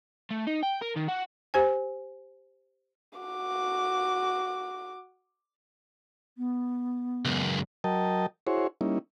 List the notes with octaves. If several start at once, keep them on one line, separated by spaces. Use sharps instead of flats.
A3
D#4
G5
A#4
D#3
F#4
G4 C5 G#5
F#4 D6
B3
C#2 F#2
F#3 A#4 D#5 G5 A5
E4 F#4 G#4 C5 C#5
G3 A#3 C#4 D#4 E4